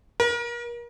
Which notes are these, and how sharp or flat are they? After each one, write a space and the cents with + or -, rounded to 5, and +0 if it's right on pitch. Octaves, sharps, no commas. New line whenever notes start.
A#4 +35